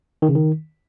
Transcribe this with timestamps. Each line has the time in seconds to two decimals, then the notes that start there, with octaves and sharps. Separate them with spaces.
0.22 D#3
0.29 C#3
0.35 D#3